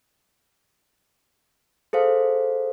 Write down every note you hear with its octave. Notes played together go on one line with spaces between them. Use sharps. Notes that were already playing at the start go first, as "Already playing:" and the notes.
G#4 A4 C5 F5